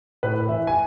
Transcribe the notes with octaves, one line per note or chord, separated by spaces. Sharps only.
A2 B4
E3 E5
G#5